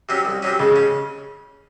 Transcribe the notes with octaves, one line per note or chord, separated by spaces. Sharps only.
C3 F#3 C#4
C2
C3 F#3 C#4
G#2 C#3
C#3
C#4